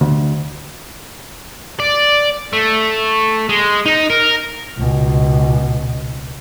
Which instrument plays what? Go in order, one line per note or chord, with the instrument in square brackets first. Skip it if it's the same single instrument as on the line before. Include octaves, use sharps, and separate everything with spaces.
[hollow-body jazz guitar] D2
[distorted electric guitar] D5
A3
G#3
D#4
A#4
[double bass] C#2 B2